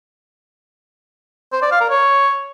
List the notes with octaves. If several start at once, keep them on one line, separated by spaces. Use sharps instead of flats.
C5
D5
F5
A#4
C#5